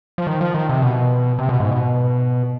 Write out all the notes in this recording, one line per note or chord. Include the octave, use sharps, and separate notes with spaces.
F3
D#3
F3
D#3
C3
B2
C3
B2
G#2
B2